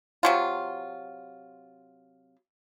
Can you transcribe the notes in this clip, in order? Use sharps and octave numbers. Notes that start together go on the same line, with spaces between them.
C3 F#3 F4